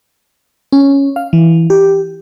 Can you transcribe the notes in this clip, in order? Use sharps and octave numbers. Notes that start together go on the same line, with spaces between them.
C#4
F5
E3
G4